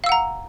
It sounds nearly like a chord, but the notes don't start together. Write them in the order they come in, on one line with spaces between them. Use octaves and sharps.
F5 E6 F#5 A#5